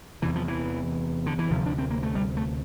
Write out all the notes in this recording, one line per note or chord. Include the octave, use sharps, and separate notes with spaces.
E2 C3 E3
F3
E3
D3
E3
D2 C3 F3
D4
C4
A#3
A3
G3
A3